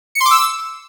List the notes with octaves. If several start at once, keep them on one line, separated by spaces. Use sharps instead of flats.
C#7
C6
D6
E6